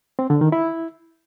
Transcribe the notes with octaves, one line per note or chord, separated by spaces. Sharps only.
C4
D3
D#3
E4